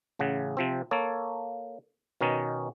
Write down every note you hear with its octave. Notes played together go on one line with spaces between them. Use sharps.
A1 C#3 F#5
C3 F3 C4
A#3 A4 C#5
B2 D#3 C#4 D#4